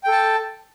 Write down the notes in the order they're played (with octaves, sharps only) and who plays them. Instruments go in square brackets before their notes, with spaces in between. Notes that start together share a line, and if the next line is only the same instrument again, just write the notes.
[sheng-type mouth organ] G5
A4
A5